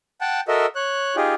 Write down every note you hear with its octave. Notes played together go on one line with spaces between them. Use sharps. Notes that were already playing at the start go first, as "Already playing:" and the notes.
F#5 G5 A5
F#4 A4 A#4 D#5 E5
C#5 F#6
D#4 F4 G4 G#4